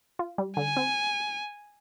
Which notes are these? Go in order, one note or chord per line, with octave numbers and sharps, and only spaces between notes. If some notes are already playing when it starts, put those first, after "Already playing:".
F4
G3
D3 G#5
C4